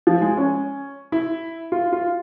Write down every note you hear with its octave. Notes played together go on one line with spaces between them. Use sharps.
F3
G#3
C#4
E4
F4
F4